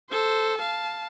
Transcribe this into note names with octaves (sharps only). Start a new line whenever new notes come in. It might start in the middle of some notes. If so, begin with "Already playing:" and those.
A4 C5
F5 A5